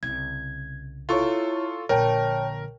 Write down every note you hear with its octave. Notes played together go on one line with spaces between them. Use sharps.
C2 C#3 G#6
E4 F4 A4 C#5 C#6
A#1 D3 A#4 C#5 G5 A5